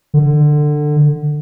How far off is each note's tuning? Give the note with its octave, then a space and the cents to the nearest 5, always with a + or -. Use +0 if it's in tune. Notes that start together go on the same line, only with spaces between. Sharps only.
D3 +20